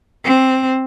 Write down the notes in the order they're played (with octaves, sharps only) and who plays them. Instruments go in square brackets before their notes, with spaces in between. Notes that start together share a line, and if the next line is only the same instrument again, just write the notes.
[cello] C4